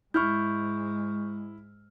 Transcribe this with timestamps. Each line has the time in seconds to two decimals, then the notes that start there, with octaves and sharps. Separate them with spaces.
0.14 G#2 G#3 E4 C#6 F6 G6